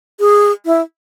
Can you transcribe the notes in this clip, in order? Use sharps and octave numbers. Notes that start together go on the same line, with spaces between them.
G#4
E4